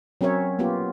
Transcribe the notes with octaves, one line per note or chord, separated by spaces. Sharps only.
F#3 C4 C#4 A#4 C#5 E5
A#3 B3 F4 G4